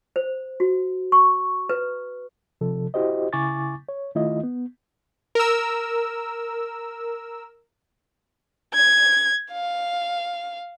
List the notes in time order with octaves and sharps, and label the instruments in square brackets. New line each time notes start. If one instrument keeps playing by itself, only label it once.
[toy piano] C5
F#4
C#6
B4
[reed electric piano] C3 F3 A4
E4 F#4 G4 C5 D#5
C#3 E4 G#5 C#6 D6 A6
C#5
D#3 A3 E4 F4 D#5
B3
[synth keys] A#4 E6
[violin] G#6
F5